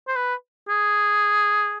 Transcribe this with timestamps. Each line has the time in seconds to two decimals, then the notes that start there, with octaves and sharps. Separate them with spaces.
0.08 C5
0.16 B4
0.69 G#4